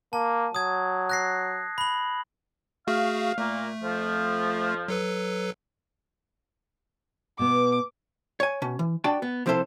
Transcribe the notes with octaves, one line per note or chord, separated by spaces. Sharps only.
A#3 A5
F#3 D#6 G#6
F#6 A#6 C7
B5 F#7
A3 F#4 G#4 F5
A#2 A3 A#3
F2 F3
F#3 A4 B4
B2 B3 D6
C#5 G#5
B2 C#4
E3
D4 F#4 D5 G5 A5
B3
C2 F3 C4 E4 A4 C5